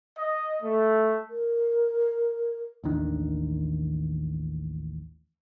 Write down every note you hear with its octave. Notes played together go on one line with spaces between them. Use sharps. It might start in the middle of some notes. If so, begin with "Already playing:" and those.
D#5
A3
A#4
A1 D#2 D#3 D4